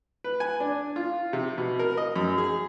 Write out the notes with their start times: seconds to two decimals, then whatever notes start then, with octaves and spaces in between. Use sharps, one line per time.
0.24 B4
0.40 G#5
0.60 D4
0.96 F4
1.33 C3
1.58 B2
1.79 A#4
1.97 D#5
2.16 F#2
2.38 G#4